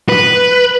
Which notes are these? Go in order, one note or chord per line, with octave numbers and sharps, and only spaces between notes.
B4